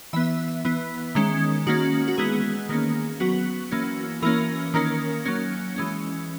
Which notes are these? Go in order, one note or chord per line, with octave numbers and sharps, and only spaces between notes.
E3 B3 E5
E3 B3
D#3 G#3 C#4
D#3 A#3 C#4 F#4
F#4
E3 G#3 B3 G#4
D#3 A#3 C#4
F#3 B3 F#4
E3 A#3 C#4
E3 A#3 C#4 A#4
D#3 A#3 C#4
F#3 A#3 C#4
E3 G#3 C#4